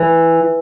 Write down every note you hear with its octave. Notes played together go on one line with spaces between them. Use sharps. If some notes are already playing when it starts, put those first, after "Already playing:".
Already playing: E3